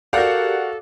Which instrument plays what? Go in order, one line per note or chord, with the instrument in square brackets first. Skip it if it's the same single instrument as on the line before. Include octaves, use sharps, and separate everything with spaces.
[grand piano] F#4 F5 [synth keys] G4 A#4 [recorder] A4 [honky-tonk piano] D5 F#5 D6